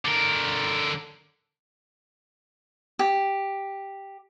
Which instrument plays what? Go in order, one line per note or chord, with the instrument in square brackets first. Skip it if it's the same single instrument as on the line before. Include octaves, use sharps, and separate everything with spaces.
[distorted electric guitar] D3 A#4
[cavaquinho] G4